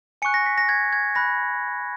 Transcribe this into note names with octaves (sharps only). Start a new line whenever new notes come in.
G#5 C#6 F#6 C#7
A#6
B6
A#6
G#6
G#6
B5 F#6 A#6